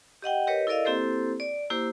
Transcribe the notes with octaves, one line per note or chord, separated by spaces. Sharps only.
G4 D#5 F#5 G5
G4 A#4 B4 C#5 D#5
E4 A4 A#4 D5 D#5 F5
A#3 C4 E4 G4 A4 C5
D5
A#3 E4 G4 C5